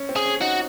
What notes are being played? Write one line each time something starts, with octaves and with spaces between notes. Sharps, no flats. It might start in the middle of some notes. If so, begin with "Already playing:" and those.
Already playing: C#4
C4
G#4
C#4
D#4 F#4